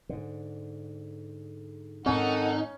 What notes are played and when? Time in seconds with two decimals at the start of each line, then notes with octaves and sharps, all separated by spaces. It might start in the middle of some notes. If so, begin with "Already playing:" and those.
0.09 G#2 D3
2.06 G#2 D#3 C4 C#4 D#4 A4 F#5